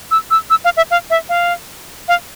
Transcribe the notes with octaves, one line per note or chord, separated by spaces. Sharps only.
E6
E6
E6
F5
E5
F5
E5
F5
F5